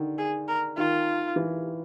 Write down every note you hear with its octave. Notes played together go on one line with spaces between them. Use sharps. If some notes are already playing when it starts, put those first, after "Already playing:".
Already playing: D3 D#3
G#4
A#4
D#3 F4
E3